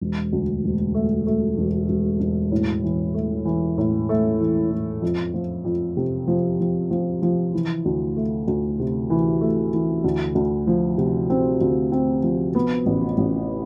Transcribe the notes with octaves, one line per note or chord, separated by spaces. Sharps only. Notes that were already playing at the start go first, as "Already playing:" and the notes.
E1
D2
E1
A3
A3
E1
E1
E1
A2
E3
A3
E3
A2
A3
E3
A2
F2
F3
F2
C3
F3
F3
F3
F3
E3
D2
A3
D2
C3
E3
A3
E3
D2
D2
F3
C3
C4
D2
C4
F3
B3
A1
A1